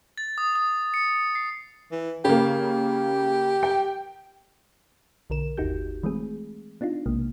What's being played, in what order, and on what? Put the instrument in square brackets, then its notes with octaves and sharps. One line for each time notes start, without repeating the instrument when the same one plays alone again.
[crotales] A6
D#6
D#6
C#7
C7
[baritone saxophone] E3
[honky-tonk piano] C#3 A#3 [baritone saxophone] G4
[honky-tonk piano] G5
[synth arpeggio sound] B1 D3 A#4 E7
G1 D#2 D#4 F#4 G4 G6
E3 G#3 A3 C4 G#4
B3 D4 D#4 F4
B1 C3 G#3 A#3